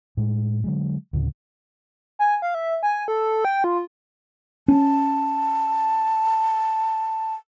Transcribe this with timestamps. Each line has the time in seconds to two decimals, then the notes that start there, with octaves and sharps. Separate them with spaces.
0.17 A2 G#3
0.64 D3 F#3 G#3
1.13 D2 A2 C#3
2.19 G#5
2.42 F5
2.55 E5
2.83 G#5
3.08 A4
3.45 G5
3.64 F4
4.68 C#4 A5